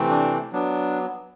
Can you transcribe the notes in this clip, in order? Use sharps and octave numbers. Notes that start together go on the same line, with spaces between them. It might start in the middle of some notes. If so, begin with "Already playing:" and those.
Already playing: C3 E3 A3 C4
D4
F#3 B3 D4